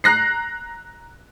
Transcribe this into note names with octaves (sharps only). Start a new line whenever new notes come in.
A#5 F#6 A#6 C7